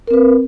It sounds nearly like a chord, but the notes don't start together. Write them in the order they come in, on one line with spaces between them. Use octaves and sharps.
A#4 C4 B4